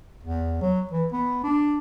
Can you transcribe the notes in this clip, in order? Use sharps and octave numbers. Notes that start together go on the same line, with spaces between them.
E2
F#3
E3
B3
D4